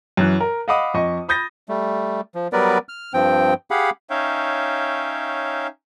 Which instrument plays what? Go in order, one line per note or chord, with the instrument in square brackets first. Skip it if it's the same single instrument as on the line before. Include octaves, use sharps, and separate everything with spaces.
[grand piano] F#2 E3 F#6
A#4
D#5 F5 F#5 B5 D6 D#6
F2 D#5 C#6
B5 D#6 G6 A6 A#6
[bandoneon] G3 A3
F3
F#3 G3 B3 A#4 B4 D5
F6
G2 F3 C4 G5
G4 G#4 F5 F#5 B5
[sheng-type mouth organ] C#4 D#4 C#5 E5 F5 G5